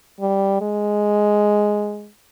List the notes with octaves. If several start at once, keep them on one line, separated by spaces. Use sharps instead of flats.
G3
G#3